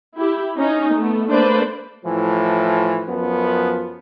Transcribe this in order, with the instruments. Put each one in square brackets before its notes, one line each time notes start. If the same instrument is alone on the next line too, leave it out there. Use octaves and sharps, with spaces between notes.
[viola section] E4 G4
C#4 D#4
A3 B3
A3 A#3 D4 B4 C5 D5
[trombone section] A2 E3 F3
F#2 F3 B3